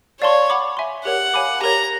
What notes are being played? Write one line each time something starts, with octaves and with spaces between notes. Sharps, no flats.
C#5 D5 F5 A5 C6
F#5 B5 D6
E5 G#5 C6
G4 A#4 C#5 F#5
C#5 F5 G#5 B5 D6
G4 A#4 C#5 A#5